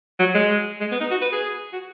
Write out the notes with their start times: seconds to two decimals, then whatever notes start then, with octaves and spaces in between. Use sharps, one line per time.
0.20 F#3
0.35 G#3
0.80 G#3
0.91 B3
1.00 D#4
1.11 F#4
1.22 B4
1.32 G#4
1.73 F#4